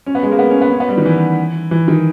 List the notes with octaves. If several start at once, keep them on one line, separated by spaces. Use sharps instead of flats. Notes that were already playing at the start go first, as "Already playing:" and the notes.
C#4
B3
G#3
A#3
B3
C#4
B3
C#4
B3
G3
D#3
E3
E3
D#3